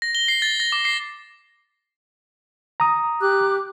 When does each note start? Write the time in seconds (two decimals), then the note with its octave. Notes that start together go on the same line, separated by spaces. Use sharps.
0.02 A#6
0.15 G7
0.28 C7
0.42 A6
0.60 A#6
0.72 D6
0.85 C7
2.80 A#5 D#6
3.21 G4 D6 F#6